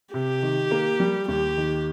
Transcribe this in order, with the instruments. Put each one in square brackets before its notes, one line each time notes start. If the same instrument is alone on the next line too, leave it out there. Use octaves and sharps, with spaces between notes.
[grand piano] C3 [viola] G4
[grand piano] D#3
A#3
G3
[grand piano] D#2 [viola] G4
[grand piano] D#3